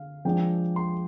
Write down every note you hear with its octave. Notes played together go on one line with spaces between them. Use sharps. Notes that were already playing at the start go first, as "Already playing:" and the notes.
Already playing: D3 F5
F3 G#3 D4 G5
C6